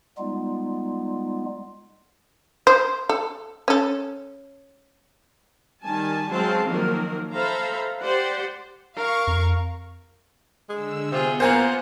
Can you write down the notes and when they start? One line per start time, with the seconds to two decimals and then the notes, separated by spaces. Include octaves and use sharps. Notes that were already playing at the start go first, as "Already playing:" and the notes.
0.18 G3 G#3 B3 D#4 F4
2.67 C5
3.09 A4
3.68 C#4 A4
5.83 D#3 G3 G#5 A5
6.31 F#3 G#3 C4 C5 F5 A5
6.66 D#3 F3 F#3 A#3 A#4
7.34 A4 C5 E5 F5 A#5 B5
8.01 G4 C5 D5 F#5
8.97 A#4 F5 C#6
9.27 F2
10.69 D3 G#3 E6
11.12 C3 B3 F4 G#4
11.40 A#3 F4 C5 F#5 G#5 A#5